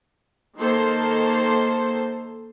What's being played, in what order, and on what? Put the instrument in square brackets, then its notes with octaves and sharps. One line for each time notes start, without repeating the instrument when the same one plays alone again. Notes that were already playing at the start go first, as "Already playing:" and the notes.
[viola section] D#3 A#3 A4 C5 C6